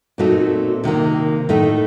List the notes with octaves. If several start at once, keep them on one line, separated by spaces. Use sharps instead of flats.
A#2 A3 C4 D#4 F#4
C3 D#3 A#3
A2 A3 D#4